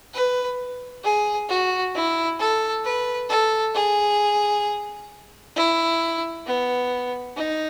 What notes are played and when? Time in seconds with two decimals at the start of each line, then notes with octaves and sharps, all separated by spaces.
0.14 B4
1.04 G#4
1.49 F#4
1.95 E4
2.40 A4
2.84 B4
3.30 A4
3.75 G#4
5.56 E4
6.46 B3
7.36 D#4